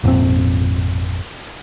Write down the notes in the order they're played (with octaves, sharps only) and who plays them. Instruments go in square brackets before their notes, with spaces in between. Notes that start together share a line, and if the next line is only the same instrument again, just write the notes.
[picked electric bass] G#1 F2 A#2 C4